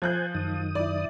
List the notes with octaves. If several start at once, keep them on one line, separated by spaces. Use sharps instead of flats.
F3 C5 G#5 F#6 G6
F#2 D#3 D#6
E4 D5